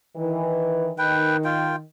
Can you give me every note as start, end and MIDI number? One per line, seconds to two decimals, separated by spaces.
0.16 0.92 51
0.16 0.92 52
0.98 1.82 51
0.98 1.37 71
0.98 1.37 79
1.44 1.76 65
1.44 1.76 79